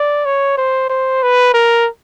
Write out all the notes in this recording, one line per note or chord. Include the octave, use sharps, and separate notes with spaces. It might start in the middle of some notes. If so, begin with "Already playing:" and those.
Already playing: D5
C#5
C5
C5
B4
A#4